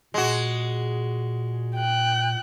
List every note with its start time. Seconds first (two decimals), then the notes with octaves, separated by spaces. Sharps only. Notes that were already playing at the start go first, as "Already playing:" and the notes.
0.14 A#2 G#3 F#4
1.75 G5 F#6